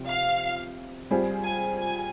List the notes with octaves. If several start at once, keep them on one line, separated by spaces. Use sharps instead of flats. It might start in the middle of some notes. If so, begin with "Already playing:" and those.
Already playing: C3 F3
F5
G3 C4 F4 G#4
G#5
G#5